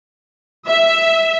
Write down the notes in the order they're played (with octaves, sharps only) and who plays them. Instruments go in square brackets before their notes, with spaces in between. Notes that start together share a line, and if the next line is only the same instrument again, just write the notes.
[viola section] E5